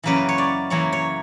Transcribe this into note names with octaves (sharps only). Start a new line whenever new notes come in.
F#2 C#3 E3 A#3 B4
C#5
D5
F#2 C#3 E3 A#3 C#5
C#5